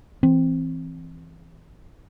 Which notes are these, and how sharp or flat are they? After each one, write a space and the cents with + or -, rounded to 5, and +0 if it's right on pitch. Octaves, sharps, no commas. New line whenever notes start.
E3 +0 C4 +0